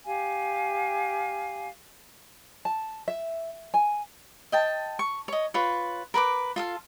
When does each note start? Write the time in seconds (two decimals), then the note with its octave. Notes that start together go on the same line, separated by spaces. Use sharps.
0.05 G4 F5 G#5
2.65 A5
3.08 E5
3.74 G#5
4.52 D#5 G5 A5
4.99 C#6
5.28 C#5 D#5
5.54 F4 B4 C#5
6.14 A#4 B4 A#5 D6
6.56 F4 A4 F5